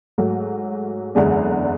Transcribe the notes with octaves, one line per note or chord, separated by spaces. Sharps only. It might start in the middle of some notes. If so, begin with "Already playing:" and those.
G#2 F#3 A3
F#1 E2 D3 G#3 D4